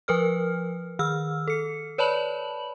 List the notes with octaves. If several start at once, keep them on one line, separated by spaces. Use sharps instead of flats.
F3 A#4 B4 F6
D#3 E6 F6
A4 C#7
B4 C#5 D5 A5 B5 F#7